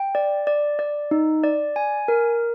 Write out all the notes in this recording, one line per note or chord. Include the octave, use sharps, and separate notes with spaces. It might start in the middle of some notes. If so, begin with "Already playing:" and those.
Already playing: G5
D5
D5
D5
D#4
D5
G#5
A#4